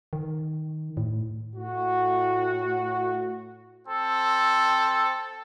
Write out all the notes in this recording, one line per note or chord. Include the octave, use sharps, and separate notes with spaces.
D#3
A2
A2 F#4
C4 A4